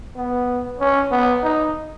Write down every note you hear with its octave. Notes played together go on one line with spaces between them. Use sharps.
B3
C#4
B3
D#4